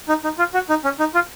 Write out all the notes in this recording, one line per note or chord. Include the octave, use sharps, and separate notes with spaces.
D#4
D#4
F4
F#4
D#4
C#4
D#4
F4